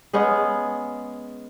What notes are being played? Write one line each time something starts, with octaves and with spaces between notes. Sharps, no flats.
G#3 B3 C#4 G#4